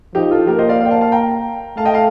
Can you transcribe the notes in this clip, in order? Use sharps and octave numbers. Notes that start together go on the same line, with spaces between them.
F3 D#4 G4
F4 A4
A#3 G4 A#4
C5 D#5
D5 F5
D5 F5
G5
F5 A5
F5 A5
G5 A#5
A3 F5 A5
D#5 G5
F5 A5